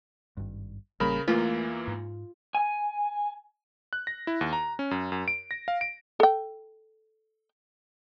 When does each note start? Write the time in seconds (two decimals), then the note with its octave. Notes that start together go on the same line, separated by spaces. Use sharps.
0.37 G#1 G2
1.00 A1 C#3 G3 A#3 A#4 B5
1.28 E2 E3 A3 A#3 F4
1.87 G#2
2.55 G#5
3.93 F#6
4.07 A#6
4.27 E4
4.41 D#2
4.53 A#5
4.79 C#4
4.91 F#2
5.12 F#2
5.28 D7
5.51 A#6
5.68 F5
5.81 D7
6.20 A4 G5